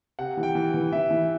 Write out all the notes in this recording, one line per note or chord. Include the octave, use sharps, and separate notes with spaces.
C3 F#5
E3
G5
E3
E3
E3 E5
E3